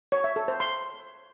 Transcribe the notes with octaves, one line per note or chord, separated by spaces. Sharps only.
C#5
E5
A4
C5
C6